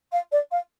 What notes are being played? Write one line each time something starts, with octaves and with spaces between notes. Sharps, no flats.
F5
D5
F5